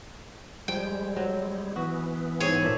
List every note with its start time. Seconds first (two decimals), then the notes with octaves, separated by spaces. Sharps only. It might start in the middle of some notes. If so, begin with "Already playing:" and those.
0.68 F3 G3 G#3 G5
1.16 F#3 C4
1.76 E3 B3 F#4
2.40 G#2 C4 G#4 C#5
2.62 A#2 A3 E5